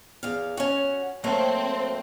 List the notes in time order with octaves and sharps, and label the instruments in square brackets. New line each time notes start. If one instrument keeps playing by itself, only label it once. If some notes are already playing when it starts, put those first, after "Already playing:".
[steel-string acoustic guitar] E2 F5
C#4 F#4
[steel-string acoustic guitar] F#3 A3 A#3 [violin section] C4